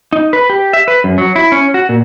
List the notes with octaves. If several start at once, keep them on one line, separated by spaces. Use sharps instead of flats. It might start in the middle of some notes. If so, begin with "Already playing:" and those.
D#4
B4
G4
E5
B4
F#2
F#3
E4
C#4
F#4
A#2